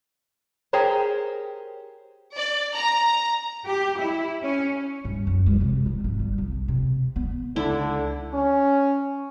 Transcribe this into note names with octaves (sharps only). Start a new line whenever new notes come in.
G4 G#4 A#4 C5 C#5
D5
A#5
G4
E4
C#4
G2
F#2
G#3
C3
D#2
G#1
G3
C2
C3
B3
C#2 D3 E4
C#4